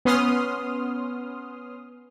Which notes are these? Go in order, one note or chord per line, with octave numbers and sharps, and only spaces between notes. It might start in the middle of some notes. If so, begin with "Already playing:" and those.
B3 C#4 C6 D#6 F6